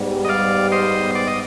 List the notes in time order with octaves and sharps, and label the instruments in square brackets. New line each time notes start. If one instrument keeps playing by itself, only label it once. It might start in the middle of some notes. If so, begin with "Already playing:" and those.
Already playing: [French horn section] G#2 G3 B3
[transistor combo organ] D#5
D5 F5
C5 D#5
D5
D#5